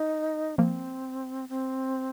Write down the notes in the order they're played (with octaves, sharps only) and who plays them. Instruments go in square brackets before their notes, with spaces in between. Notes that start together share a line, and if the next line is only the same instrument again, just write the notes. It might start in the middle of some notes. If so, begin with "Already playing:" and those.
Already playing: [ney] D#4
[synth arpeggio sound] F3 A#3 [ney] C4
[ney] C4